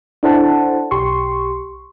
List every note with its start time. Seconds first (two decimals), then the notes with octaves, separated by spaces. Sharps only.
0.23 D4 E4 A4 C5 F#5 A5
0.91 B1 G4 C6 C#6